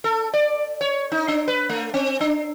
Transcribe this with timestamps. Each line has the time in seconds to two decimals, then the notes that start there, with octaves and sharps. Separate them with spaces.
0.04 A4
0.34 D5
0.81 C#5
1.12 D#4
1.28 D4
1.48 B4
1.69 A3
1.94 C4
2.20 D4